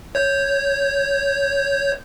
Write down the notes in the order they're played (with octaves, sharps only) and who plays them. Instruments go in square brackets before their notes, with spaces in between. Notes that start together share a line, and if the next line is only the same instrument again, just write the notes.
[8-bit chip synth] C#5 G6